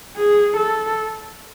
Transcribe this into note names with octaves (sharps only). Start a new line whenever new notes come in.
G#4
A4